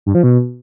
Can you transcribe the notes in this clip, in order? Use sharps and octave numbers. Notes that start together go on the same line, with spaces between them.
G2
F3
B2